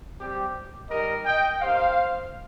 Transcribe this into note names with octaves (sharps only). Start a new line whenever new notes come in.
G3 C4 G4
G3 D#4 G4 A#4 D#5
D#5 G5
A#3 D#4 G4 C5 F5